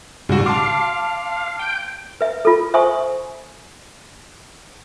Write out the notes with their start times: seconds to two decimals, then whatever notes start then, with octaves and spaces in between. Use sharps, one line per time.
0.29 C#2 G#2 C#3 G3 F#4
0.46 F5 A5 C6 D6
1.59 G5
2.21 B4 E5
2.45 F4 A4
2.74 C5 E5 G#5 C6 C#6 D#6